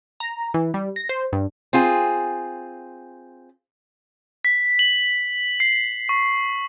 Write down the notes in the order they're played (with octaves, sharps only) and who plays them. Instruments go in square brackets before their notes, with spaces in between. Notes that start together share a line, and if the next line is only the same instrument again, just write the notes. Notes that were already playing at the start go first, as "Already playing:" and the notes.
[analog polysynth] A#5
E3
G3
A#6
C5
G2
[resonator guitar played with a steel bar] C4 F4 G#4
[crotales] B6
F#7
C7
C#6